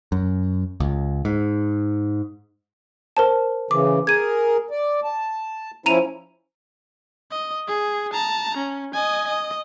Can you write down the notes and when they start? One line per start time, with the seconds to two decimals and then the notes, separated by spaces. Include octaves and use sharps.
0.12 F#2
0.80 C#2
1.25 G#2
3.17 A#4 C5 A5
3.71 C#3 E3 D6
4.07 G#4 A#4 G#6 D#7
4.71 D5
5.04 A5
5.86 F3 C#4 E4 A#5 D#7 F7
7.31 D#5
7.67 G#4
8.13 A5 A#5
8.57 C#4
8.93 D#5 G#5
9.27 D#5